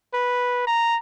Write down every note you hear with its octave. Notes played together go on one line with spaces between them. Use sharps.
B4
A#5